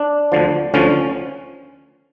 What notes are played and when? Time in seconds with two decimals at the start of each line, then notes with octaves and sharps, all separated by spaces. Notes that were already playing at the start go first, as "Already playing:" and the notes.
Already playing: D4
0.32 D2 D3 F3
0.74 D2 D3 F3 C#4